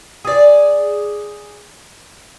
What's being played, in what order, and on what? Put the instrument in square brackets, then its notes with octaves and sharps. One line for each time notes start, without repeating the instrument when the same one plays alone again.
[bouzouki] G#4 D5